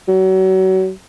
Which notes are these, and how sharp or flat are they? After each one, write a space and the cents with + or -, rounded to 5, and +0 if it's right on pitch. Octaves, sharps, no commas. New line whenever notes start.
F#3 +30